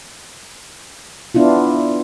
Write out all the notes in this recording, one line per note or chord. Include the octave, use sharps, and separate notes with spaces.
B3 D4 E4 F4